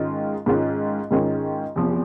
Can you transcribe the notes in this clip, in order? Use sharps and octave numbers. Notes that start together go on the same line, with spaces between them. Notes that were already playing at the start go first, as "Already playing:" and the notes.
Already playing: G#2 D#3 G#3 C#4 F4
G#2 D#3 G#3 C#4 F4
G#2 D#3 G#3 C#4 F4
E2 C3 F3